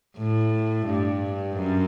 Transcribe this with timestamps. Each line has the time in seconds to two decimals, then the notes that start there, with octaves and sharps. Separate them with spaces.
0.17 A2
0.86 G2
1.57 F#2